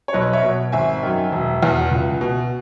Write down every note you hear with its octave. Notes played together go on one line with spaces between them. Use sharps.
C#5
B1 B4 D#5
C#5 E5
B2
G#1 E5 G#5
F#2 D#3
E1
E2 B2
C#2
B2